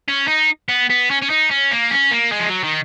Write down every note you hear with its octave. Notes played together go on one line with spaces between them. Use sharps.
C#4
D#4
B3
B3
C#4
C#4
D#4
C#4
A#3
C#4
A#3
G#3
F3
F#3
D#3